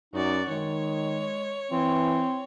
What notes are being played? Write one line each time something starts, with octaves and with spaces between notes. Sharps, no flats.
F#2 D#4 F#4 D5
D#3 G#3 C#5
E3 C4